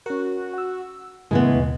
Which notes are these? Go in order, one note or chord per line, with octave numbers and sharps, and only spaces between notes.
C#4 F#4 A#4
F#5 E6
A2 C#3 E3 G#3 B3
D#2 B2